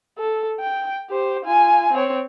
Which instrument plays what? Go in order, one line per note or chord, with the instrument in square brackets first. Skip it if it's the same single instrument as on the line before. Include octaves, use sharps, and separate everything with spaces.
[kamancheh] A4
G5
G4 C5
F4 G#5
C4 C#5